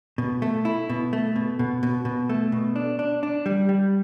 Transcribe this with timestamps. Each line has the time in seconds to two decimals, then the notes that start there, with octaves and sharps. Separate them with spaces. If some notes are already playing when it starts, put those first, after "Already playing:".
0.18 B2
0.42 A3
0.65 E4
0.89 B2
1.13 A3
1.36 B2
1.59 B2
1.83 B2
2.05 B2
2.29 A3
2.52 B2
2.76 D4
2.99 D4
3.23 D4
3.46 G3
3.69 G3